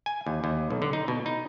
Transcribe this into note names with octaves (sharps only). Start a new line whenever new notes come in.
G#5
D#2
D#2
B1
D3
D#4
B2
D#4